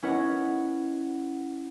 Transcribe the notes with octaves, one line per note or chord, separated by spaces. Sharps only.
C#4 E4 B4 C#5 D#5 F#5